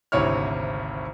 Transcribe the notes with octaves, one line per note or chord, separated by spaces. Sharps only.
G#1 D2 C3 E4 C#5 F6